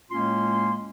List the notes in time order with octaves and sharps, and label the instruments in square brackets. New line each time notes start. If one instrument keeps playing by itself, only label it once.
[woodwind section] A2 G#3 A#3 C#4 F4 C6